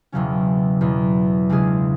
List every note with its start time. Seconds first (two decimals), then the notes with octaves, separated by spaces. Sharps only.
0.12 E1 E2 C#3 F#3 C#4
0.81 E2 B2 F#3
1.50 C#2 C#3 G#3 D4 G#4